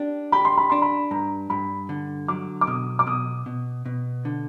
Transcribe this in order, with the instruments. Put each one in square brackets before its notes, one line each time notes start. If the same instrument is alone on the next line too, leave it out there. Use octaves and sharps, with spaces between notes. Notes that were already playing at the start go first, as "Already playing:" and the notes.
Already playing: [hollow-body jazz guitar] D4 G4
[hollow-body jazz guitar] G4 [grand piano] B5
[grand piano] C6
B5
[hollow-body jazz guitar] D4 [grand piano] C6
[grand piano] B5
[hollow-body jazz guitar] G2 [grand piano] A#5
[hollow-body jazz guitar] G2 [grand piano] B5
[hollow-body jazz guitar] D3
[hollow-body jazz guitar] F#3 [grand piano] D6
[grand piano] D6
[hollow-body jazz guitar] B2 [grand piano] D#6
[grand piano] D6
[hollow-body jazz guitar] B2 [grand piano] D#6
[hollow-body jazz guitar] B2
B2
D3